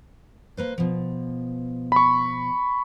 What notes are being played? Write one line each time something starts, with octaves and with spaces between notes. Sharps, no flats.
A#3 B4 C5
B2 F3
B5 C#6